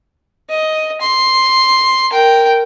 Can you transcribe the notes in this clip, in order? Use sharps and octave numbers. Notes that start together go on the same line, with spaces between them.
D#5
C6
A#4 G5